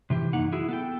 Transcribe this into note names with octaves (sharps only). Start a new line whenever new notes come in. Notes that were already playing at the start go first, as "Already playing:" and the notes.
C3 E3 G4
F#2 A#3 D#4 F#5
E4 F#4 G#4
B3 A4 G5